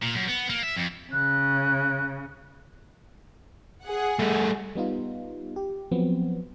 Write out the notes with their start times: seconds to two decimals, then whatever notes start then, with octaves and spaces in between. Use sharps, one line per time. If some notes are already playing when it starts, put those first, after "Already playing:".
0.02 A#2
0.15 F#2
0.28 B3
0.50 A#3
0.63 E5
0.76 F2
1.13 C#3 F#6
3.85 G#4 F#5
4.19 G3 A3
4.75 G3 B3 D#4 F4
5.56 G4
5.91 F3 F#3 B3 C4